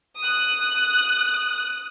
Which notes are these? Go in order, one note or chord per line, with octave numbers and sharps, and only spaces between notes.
D#6 F#6